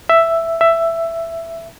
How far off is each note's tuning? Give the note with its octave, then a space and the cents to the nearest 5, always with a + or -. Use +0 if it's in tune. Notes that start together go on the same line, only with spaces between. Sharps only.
E5 +5
E5 +10